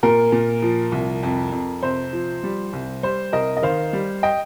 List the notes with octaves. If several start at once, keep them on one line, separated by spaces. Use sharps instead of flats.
A#2 A#4
A#2
F3
C2
F2
F2
C3 C5
F3
G3
C2
G3 C5
C2 A#4 D#5
D#5
D#3 C5 F5
G3
D#5 G5